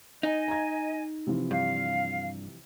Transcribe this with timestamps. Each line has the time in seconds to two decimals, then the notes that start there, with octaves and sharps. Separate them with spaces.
0.23 D#4 D#5 G#5
0.48 A#5 G#6
1.27 C3 E3 F3
1.51 G2 F5